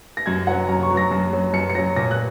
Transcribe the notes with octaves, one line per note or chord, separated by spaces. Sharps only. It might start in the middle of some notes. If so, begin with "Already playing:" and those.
A#6
F#2 G#6
F#3 C#4 F#5
F#2 A#5
C#6
F#3 C#4
A#6
F#2
F#3 C#4
F#2 C#7
C#7
F#3 C#4 A#6
A#2 A#6
F#6